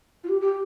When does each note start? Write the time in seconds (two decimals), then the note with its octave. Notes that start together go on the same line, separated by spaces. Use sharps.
0.24 F4
0.29 G4
0.41 G4